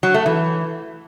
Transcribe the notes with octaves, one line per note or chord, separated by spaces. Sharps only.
F#3
A3
E3